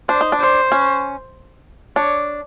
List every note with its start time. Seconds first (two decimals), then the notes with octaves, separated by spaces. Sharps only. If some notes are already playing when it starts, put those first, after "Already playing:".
0.09 D4 C5
0.21 D#4
0.32 D4
0.40 C5
0.72 C#4
1.96 D4 C#5